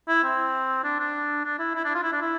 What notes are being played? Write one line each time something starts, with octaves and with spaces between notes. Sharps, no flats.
E4
C4
D4
D4
D4
E4
E4
D4
F4
E4
D4
E4